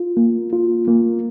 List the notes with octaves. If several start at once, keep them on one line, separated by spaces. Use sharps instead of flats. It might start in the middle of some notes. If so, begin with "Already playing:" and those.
Already playing: F4
A#3
F4
A#3